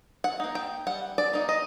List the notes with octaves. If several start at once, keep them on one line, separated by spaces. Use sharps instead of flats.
F#5
A#3 D#4
G5
G3 F#5
D5
A#3 D#4
D#5